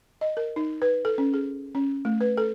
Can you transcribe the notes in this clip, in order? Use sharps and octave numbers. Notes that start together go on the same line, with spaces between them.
D#5
A#4
D#4
B4
A4
C#4
G#4
C#4
A3
B4
A4